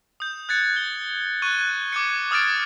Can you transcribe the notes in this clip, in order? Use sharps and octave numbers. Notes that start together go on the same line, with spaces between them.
D#6 G6
F#6 G#6 A6 C#7
G#6 G7
C#6 F#6 G#6 D#7
D6 G#6 C#7
D6 D#6 F6 G#6 A6 D7